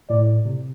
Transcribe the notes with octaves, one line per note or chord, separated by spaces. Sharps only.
A2 D5
C3